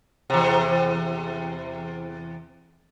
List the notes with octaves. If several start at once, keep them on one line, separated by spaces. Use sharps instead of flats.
E2 C3